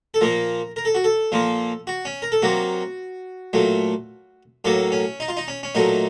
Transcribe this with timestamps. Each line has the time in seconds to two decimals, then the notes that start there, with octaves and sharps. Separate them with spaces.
0.14 A4
0.21 A#2 F3 A#3 A#4
0.76 A#4
0.85 A4
0.95 F#4
1.04 A4
1.32 A#2 F3 A#3
1.87 F#4
2.05 C#4
2.22 A#4
2.32 A4
2.42 C3 F#3 A#3 F#4
3.53 A#2 F#3 A3
4.65 A2 F#3 A#3 A4
4.92 C#4
5.20 D#4
5.28 F4
5.37 D#4
5.48 C#4
5.63 C#4
5.75 A#2 F#3 A3 D#4